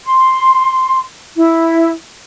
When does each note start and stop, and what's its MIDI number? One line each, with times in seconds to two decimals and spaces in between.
0.05 1.01 84
1.36 1.91 64